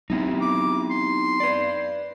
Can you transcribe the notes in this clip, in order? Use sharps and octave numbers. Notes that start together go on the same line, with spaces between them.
F#3 B3 C4 D#4 E4 G4
D6
C6
B4 D5